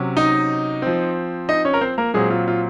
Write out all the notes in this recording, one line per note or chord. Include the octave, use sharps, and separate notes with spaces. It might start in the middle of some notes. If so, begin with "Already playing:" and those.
Already playing: C3 F#3 C#4
D#4 D#5
F3 C4
D#4 D#5
C#4 C#5
A#4
C4 C5
A#3 A#4
A#2 F#3 G#3 C4 G#4
F4
F4